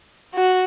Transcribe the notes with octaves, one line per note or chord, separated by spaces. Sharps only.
F#4